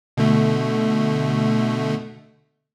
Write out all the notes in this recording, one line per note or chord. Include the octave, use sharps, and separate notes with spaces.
B2 D3 A3